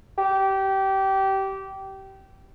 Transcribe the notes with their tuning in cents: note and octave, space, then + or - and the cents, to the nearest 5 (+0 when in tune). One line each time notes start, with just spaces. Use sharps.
G4 -20